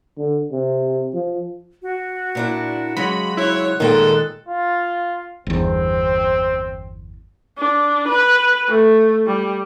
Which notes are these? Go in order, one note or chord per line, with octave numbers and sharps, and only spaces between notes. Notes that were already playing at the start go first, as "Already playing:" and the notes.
D3
C3
F3
F#4
A#2 D4 E4
C#3 F#3 G#3 B5
E4 C#5 F#6
A#2 D#3 G#3 A4 G5
F4
G1 E2 C4
D4
B4
A3
G3